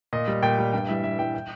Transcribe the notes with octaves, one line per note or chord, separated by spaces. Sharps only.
A#2 D#5
G3
A#2 G5
G3
G2 G5
E3 G3 E5
G2 E5
E3 G3 G5
G5